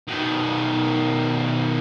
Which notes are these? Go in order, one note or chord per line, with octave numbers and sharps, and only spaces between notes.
B2 D#3